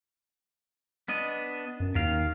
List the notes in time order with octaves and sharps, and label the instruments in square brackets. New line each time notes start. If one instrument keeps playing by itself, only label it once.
[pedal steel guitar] B3 D4 D#5
[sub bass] F#2
[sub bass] D#2 [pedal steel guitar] D#3 F5